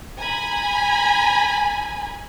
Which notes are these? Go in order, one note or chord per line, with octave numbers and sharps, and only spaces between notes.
G#5 A#5 B5